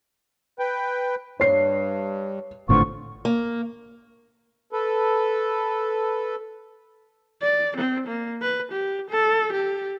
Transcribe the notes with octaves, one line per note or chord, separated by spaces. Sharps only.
B4 G5
G2 C#5 C7
G#1 A2 D3 B3 C4 F4 C#6
A#3
A4 B4
D5
C4
A#3
B4
G4
A4
G4